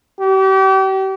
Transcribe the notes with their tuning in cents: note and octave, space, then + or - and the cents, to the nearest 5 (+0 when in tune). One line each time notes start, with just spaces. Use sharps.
G4 -35